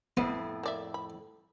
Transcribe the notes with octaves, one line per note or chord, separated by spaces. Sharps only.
F2 A2 B3 F#5
A#3 D5 E5
B5